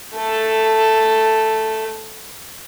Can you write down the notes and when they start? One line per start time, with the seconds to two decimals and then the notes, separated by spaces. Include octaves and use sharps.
0.15 A3 A4